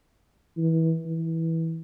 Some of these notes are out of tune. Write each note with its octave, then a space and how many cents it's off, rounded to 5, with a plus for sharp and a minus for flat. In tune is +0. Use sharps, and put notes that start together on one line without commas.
E3 -25
E3 -15